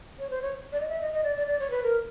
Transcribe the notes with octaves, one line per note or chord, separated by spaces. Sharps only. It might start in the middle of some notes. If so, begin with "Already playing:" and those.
C#5
C5
C#5
D5
D#5
E5
D#5
D#5
D5
D5
D5
C#5
B4
A#4